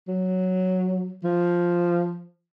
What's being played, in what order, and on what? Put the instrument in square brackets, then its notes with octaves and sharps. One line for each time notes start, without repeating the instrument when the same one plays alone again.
[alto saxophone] F#3
F3